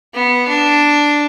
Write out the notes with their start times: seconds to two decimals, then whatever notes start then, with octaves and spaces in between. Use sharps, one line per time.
0.14 B3
0.48 D4